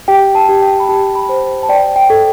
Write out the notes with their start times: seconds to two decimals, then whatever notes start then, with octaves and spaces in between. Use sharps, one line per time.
0.08 G4 G5
0.35 A5
0.49 G4
0.62 G5
0.80 B5
0.89 G4 A5
1.15 B5
1.29 C5
1.63 A5
1.69 D5 G5
1.96 G5
2.10 A4